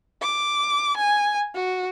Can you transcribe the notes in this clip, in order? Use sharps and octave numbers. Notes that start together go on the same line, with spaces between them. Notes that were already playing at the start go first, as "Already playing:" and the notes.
D6
G#5
F#4